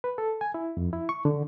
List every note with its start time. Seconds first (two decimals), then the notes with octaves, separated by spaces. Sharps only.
0.04 B4
0.18 A4
0.41 G#5
0.54 E4
0.77 F2
0.93 E4
1.09 C#6
1.25 D3